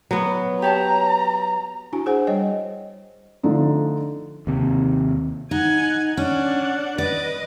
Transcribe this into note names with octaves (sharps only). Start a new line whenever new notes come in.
F#3 B3
G4 C#5 A5 A#5
D4 E4 F#4 G#5
G#4 C5 F#5 G#5
G3 C#5 D#5 G5
D3 F3 A3 D4 D#4
D#2 C3
D#4 F#5 G#5
C#4 D4 F#5
B4 D5 D#5